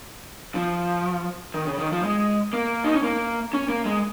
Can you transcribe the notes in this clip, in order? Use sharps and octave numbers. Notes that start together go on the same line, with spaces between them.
F3
D#3
C#3
D#3
F3
G#3
A#3
D#4
C#4
A#3
C#4
A#3
G#3